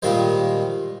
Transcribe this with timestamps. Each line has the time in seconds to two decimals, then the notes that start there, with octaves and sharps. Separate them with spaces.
0.02 A#2 D#3 G3 G#3 C5